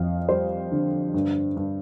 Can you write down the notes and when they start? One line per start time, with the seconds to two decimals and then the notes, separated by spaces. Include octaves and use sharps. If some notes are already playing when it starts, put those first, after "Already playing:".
Already playing: F2 D#5 F5
0.29 G3 C5
0.72 D3
1.14 G2
1.57 G2